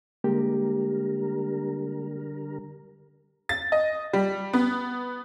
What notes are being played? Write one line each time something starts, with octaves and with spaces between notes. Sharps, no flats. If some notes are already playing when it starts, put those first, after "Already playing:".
D3 G3 G#3 A#3 G4 A#4
A6
D#5
G3
B3